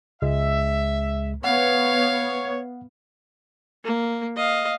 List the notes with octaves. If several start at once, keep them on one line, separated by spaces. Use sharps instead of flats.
C#2 G#3 E5
B3 C#5 F5 F#5
A#3
D#5 F5